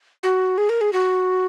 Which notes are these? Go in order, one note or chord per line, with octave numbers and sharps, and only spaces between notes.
F#4
G#4
A#4
G#4
F#4